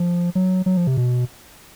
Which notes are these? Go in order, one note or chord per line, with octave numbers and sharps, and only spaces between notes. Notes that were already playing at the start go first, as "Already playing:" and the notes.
Already playing: F3
F#3
F#3
F3
C3
B2